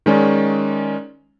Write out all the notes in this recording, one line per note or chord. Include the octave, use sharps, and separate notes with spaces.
D#3 G#3 C#4 D5